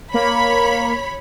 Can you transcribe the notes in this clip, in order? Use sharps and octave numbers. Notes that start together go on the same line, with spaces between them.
A#3 C#5 B5